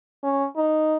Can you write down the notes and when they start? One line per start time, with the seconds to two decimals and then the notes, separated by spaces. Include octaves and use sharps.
0.24 C#4
0.57 D#4